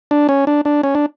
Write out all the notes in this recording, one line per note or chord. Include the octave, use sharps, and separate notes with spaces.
D4
C#4
D4
D4
C#4
D4